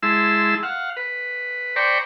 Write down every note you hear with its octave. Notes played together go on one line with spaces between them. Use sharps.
G#3 E4 A5 C6 E6
F5 F#5
B4
C5 D5 G5 A#5 B5 C#6